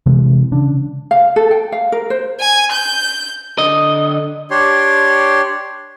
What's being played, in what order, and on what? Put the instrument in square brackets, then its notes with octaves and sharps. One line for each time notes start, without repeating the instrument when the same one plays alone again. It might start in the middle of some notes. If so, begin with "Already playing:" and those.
[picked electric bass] C3 E3 G#3
C#3 D4
[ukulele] F5
A4
G5
F5
A#4
C5
[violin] G#5
G6
[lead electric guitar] D3 D#5
[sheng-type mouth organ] D4 G4 C#5 C6